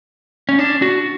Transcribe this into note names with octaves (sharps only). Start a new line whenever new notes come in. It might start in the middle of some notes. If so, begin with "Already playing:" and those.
C#4
D4
F#4